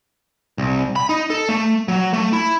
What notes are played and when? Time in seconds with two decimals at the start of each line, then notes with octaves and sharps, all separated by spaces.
0.58 C2
0.96 B5
1.09 D#4
1.30 A4
1.49 A3
1.88 F#3
2.13 A3
2.33 E4